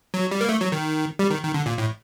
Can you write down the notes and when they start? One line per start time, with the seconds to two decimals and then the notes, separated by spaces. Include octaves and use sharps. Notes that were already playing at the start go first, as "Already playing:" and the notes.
0.14 F#3
0.31 G3
0.41 A#3
0.49 A3
0.61 F#3
0.72 D#3
1.19 G3
1.30 D#3
1.43 D#3
1.54 D3
1.66 A#2
1.78 A2